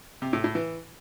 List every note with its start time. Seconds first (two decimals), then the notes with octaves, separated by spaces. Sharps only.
0.22 C3
0.33 A2
0.44 A2
0.55 E3